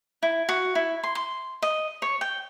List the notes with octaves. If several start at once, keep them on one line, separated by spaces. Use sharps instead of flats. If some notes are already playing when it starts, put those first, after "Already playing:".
E4
F#4
E4
C6
C6
D#5
C#5
G5